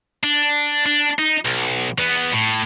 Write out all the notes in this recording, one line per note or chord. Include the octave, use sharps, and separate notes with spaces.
D4
D4
D#4
B1
E2 B3
A2